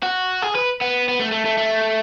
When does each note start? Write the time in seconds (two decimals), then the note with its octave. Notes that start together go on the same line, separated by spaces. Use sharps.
0.03 F#4
0.42 G#4
0.55 B4
0.81 B3
1.09 B3
1.20 A3
1.32 A3
1.45 A3
1.58 A3